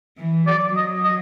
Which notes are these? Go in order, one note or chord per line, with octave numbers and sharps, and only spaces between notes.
E3
F#3 D5
F#3 D#5
D#5